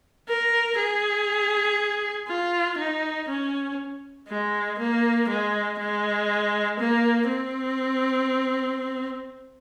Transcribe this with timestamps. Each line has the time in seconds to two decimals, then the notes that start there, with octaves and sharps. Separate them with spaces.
0.28 A#4
0.78 G#4
2.28 F4
2.78 D#4
3.29 C#4
4.28 G#3
4.79 A#3
5.29 G#3
5.79 G#3
6.79 A#3
7.29 C4